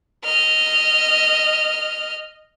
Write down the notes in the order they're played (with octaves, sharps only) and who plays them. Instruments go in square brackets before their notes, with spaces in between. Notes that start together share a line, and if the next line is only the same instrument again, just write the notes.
[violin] D#5 F6